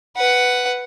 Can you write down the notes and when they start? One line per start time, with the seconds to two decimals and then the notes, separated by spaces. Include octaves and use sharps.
0.16 B4 F#5